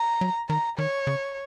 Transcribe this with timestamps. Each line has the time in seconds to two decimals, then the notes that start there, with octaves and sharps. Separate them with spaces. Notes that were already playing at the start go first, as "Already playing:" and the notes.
Already playing: A#5
0.21 F#3
0.49 D#3 A#5
0.78 D#3 C#5
1.07 C#3